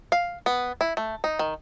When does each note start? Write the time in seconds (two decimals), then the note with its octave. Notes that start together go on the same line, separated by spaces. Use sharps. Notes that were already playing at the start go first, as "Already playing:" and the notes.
0.12 F5
0.46 B3
0.81 E4
0.97 A3
1.24 D#4
1.39 D#3